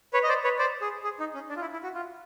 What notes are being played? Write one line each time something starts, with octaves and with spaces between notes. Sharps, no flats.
B4 C#5
D#5
C5 D5
B4 C#5
C5 D5
G#4
G#4
D#4
C#4
D4
F4
E4
E4
F#4
F4